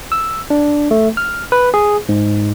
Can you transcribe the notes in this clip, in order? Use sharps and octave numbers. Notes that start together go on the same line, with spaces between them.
E6
D4
A3
F6
B4
G#4
G#2